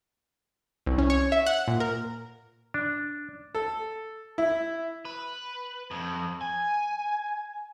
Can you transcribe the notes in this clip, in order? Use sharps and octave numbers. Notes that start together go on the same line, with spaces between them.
C2
C#4
C#5
E5
F#5
A#2
A#4
D4
A4
E4
B4
F2
G#5